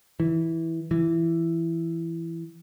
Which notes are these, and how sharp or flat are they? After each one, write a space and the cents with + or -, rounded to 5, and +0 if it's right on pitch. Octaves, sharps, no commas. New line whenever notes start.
E3 -10
E3 +10